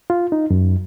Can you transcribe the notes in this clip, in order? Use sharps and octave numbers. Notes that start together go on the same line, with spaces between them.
F4
D#4
F#2